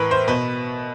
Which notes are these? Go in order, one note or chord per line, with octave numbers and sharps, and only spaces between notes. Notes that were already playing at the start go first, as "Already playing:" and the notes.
Already playing: A2 E3 A#4 B4
C5
B2 B4